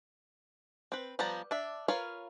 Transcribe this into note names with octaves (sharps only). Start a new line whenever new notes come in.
C4 B4
F3 G3 B3 A5 A#5
D4 E5
F4 A#4 B4 C#5 F5